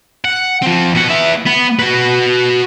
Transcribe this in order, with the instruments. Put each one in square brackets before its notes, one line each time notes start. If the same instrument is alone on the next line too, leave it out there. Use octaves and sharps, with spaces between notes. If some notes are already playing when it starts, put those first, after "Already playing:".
[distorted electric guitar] F#5
F3 C4
B2 F#5
B3 E5
B3
F#4 B4